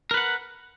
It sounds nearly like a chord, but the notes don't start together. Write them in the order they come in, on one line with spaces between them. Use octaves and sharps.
A#4 B4 F#5